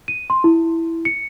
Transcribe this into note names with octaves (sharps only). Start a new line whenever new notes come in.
D#7
C6
E4
C#7